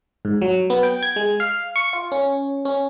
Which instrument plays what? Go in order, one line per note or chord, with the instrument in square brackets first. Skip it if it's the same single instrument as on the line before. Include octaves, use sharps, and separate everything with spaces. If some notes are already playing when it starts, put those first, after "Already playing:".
[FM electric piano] G#2
F#3
B3
G5
G#6
G#3
F5
C#6
F4
C#4
C#4